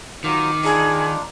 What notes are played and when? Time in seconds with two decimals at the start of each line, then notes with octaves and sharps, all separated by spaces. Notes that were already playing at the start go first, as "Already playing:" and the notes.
0.24 D#3 F#3 F4 D6
0.64 D4 D#4 F4 G#4